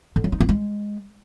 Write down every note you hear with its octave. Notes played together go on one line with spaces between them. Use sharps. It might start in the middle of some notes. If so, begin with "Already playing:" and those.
D3
F#3
D#4
B3
G#3